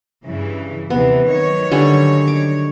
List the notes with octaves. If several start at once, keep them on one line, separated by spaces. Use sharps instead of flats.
G2 C#3 E3
D#2 C3 E3 B3
D#3 F#3 C#5
D3 G3 C#4
D6